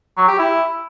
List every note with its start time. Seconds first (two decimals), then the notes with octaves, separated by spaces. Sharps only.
0.17 F#3
0.28 G4
0.39 E4